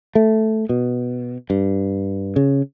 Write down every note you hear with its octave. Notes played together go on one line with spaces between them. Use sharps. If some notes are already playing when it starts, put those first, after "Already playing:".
A3
B2
G2
C#3